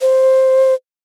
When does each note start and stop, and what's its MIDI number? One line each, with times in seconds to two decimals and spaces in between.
0.01 0.74 72